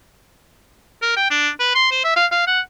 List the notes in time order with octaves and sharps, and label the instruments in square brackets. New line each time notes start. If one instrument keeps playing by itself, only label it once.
[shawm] A#4
G5
D4
B4
C6
C5
E5
F5
F5
F#5